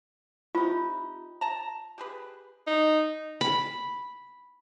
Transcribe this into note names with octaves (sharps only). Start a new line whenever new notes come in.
C3 D#4 F4
A5 A#5
G4 G#4 B4
D#4
B5